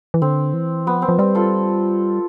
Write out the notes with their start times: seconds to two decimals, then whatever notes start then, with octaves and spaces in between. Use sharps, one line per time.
0.14 E3
0.22 D3 C4
0.54 E3
0.86 F3 B3
1.02 C4
1.09 F3
1.19 G3 C4
1.35 F4 A4